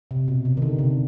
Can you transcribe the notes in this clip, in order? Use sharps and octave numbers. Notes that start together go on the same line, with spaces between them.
C3
B2
C3
D#3
D3
C3